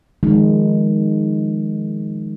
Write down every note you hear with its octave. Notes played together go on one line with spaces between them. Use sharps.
D#3 F3 G#3 D#4